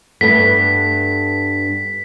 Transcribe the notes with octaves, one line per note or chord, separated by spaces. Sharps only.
G2 A3 B3 B6